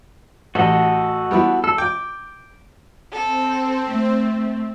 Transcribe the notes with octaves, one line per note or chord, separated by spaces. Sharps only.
A1 F#4 A4 D#5
G3 B3 E4
A4 E6
G5 D6
C4 A4
A3